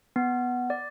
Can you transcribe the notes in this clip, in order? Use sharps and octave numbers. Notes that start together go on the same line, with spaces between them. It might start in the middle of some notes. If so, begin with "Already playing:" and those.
B3
D5